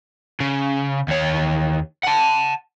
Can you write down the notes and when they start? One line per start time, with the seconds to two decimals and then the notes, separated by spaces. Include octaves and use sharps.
0.40 C#3
1.08 D#2 C#5
2.03 F#5 A5